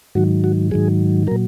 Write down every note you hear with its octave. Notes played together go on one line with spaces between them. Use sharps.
G#2 D#3 F#3 F#4
F#4
G#2 D#3 F#3 G#4
A#2 F#3 A#4